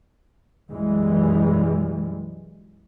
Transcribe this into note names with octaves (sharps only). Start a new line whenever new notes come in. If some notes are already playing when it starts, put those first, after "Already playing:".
B1 F#2 E3 G3 G#3